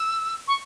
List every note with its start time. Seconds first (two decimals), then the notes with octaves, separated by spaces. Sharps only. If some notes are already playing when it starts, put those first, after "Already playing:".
Already playing: E6
0.47 C#6